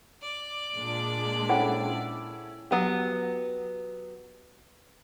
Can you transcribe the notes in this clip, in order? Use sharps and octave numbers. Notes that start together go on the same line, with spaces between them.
D5
A#2 G#3 D4
C#4 E4 A4 C5 F#5 G5
F#3 B3 G4